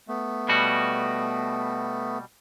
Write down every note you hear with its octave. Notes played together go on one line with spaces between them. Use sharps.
A3 B3
B2 G3 F#4